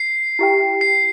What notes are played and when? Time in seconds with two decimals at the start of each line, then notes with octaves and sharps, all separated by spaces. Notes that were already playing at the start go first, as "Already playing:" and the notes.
Already playing: C7
0.39 E4 G4 E5 G5
0.81 C7